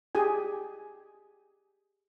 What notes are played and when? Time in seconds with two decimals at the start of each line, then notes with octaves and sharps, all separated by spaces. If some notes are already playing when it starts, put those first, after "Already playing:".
0.15 G4 G#4 G#5